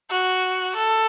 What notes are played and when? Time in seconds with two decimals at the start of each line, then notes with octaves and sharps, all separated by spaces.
0.11 F#4
0.76 A4